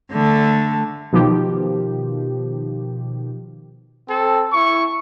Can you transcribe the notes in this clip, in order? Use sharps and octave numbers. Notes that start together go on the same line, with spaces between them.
D3 A3
B2 D#3 F3 G4
C4 A4
E4 C#6